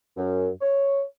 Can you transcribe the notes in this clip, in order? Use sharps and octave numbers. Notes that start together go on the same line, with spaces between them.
F#2
C#5